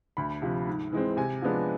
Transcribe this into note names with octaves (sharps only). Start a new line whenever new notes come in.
D2 B5
C3 F3
G#2
E3 G#3 C4
C3 G#5
F3 G#3 B3 D4